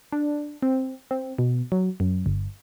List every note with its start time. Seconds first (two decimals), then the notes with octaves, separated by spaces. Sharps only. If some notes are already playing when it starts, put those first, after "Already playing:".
0.12 D4
0.62 C4
1.11 C4
1.38 B2
1.72 F#3
2.00 F#2
2.26 G1